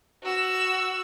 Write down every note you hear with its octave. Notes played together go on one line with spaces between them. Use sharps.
F#4 E6